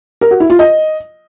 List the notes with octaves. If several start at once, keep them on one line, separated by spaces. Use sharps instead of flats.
A#4
F#4
E4
F4
D#5